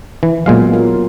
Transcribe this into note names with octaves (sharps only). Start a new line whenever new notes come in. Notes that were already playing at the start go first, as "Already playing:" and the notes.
E3
A#2 F#3 G#3 B3 F5
F4 A#4